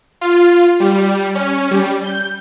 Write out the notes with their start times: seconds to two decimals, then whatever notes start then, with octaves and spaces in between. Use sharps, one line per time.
0.21 F4
0.80 G3
1.35 C#4
1.71 G3
2.04 G6